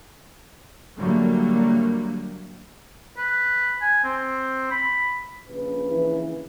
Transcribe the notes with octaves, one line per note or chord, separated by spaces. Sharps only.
D3 F#3 G3 A3 A#3
B4
G#5
C4
B5
A#1 C#3 B4
E3